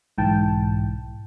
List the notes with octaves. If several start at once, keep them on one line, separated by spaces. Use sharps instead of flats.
B1 G#2 E3 G5 A5